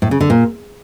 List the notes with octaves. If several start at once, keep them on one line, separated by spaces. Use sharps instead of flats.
A2
C#3
D3
A#2